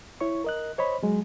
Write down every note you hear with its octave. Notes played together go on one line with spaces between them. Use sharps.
E4 C#5 C#6
A#4 D#5 F#6
C5 C#5 D#5 B5
F#3 G#3